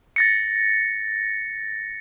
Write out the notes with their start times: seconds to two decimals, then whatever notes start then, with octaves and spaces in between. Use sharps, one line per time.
0.16 A6 A#6 C#7